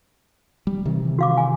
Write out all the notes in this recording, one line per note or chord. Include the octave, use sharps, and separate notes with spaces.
G3
C3 D#3 E3
F#4 F5 D6
G#5